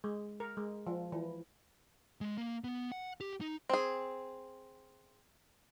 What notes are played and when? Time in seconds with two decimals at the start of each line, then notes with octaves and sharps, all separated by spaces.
0.04 G#3
0.40 A#4
0.57 G#3
0.87 F3
1.12 E3
2.21 G#3
2.37 A#3
2.64 B3
2.92 F#5
3.20 G4
3.41 D#4
3.69 C4 G#4